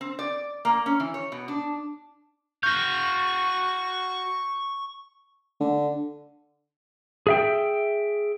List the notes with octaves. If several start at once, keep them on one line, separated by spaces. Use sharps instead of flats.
C4
D5
A#3
C#4
E3
C#5
B2
D4
F#4 F5 C#6 G6
D3
G#4 E5 G5